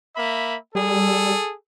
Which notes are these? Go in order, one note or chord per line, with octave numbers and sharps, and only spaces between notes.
A#3 E5 B5
G3 G#4 A4